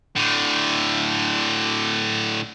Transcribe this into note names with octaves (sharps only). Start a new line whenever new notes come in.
A2 D3